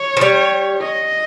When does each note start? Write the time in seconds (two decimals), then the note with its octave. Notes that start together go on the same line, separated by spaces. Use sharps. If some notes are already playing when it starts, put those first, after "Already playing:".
Already playing: C#5
0.17 F3
0.21 G3
0.81 D#5